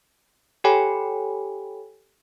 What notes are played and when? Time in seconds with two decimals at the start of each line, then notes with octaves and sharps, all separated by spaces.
0.64 G4 A4 C#5 G5 G#5 B5